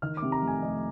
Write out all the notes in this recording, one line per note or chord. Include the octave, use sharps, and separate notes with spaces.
D#3 F6
D6
C3
A#5
F1
G#5
F1 D#5